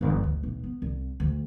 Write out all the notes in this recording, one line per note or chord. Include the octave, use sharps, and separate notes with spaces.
G1 F3
D2
B1
B3
C2
D2